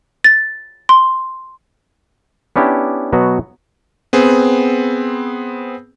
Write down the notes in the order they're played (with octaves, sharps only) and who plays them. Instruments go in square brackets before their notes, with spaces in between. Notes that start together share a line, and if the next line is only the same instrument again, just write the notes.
[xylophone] A6
C6
[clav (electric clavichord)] B3 C#4 D4 E4 G4
B2 F#3 B3 F#4
[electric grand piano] B3 C4 G#4